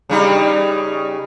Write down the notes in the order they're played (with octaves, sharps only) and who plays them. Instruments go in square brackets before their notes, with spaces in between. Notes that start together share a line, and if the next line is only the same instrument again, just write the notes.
[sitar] C#3 G3 D#4